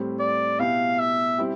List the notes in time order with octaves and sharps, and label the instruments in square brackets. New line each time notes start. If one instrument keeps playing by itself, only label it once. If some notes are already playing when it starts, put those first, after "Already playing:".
Already playing: [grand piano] A2 G3 C4 G4
[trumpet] D5
[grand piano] B2 B3 E4 G4 [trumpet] F5
[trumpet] E5
[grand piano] G3 C4 E4 G4